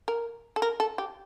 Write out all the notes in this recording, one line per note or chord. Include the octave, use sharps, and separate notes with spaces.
A#4
A4
A#4
A4
G4